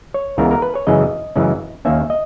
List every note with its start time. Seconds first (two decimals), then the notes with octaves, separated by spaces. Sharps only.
0.14 C#5
0.38 C#2 C#3 E3 B3 A#4
0.51 A#4
0.62 B4
0.75 C#5
0.87 F#2 C#3 E3 G#3 C#4 D#5
1.36 F#2 C#3 E3 G#3 C#4
1.85 D#2 D#3 A#3 C#4 E5
2.10 D#5